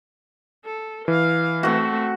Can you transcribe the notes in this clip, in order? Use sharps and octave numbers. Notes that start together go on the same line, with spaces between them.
A4
E3 F5
A3 C4 F#4 F#5